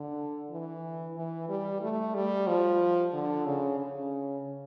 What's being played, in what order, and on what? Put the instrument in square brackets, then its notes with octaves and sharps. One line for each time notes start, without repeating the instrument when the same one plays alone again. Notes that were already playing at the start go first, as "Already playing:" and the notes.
Already playing: [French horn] D3
E3
E3
G3
A3
G3
F3
D3
C#3
C#3